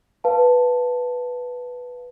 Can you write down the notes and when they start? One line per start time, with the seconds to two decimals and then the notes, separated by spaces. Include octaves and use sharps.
0.24 B4 F5 A5